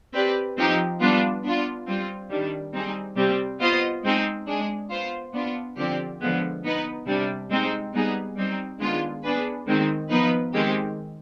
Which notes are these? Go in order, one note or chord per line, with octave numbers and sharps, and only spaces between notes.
C4 G4 B4 D5
F3 C4 D#4 G4
G3 B3 D4 F4 B4
B3 D4 F4
G3 C4 F4
D#3 G3 D4
G3 C4 D#4 G#4
C3 G3 C4
B3 F4 C5 D#5
G#3 C4 D#4
G#3 D4 G#4
B3 F4 C5
B3 D4 F4
D3 F3 C4 G4 D5
D3 F3 G#3 B3
B3 D#4 B4
C3 G3 D4
G#3 C4 D#4
G3 B3 D#4 G#4
G3 C4 D#4
D#3 G#3 B3 D4 F4
B3 D4 G#4 B4
D#3 G#3 C4 D#4
F3 B3 D#4 B4
D#3 G#3 C4 G4